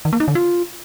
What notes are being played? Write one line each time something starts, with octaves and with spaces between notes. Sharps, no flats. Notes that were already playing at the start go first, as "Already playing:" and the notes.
D#3
A#3
D#4
D3
F4